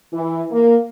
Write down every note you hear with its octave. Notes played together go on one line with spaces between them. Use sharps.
E3
A#3